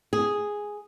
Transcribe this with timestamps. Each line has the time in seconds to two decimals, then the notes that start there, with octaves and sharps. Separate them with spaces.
0.13 G#4